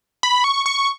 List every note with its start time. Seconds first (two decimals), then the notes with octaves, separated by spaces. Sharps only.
0.23 B5
0.44 C#6
0.66 C#6